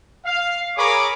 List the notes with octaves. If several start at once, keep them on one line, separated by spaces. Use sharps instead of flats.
F5
G#4 A#4 C#5 B5 C#6 D6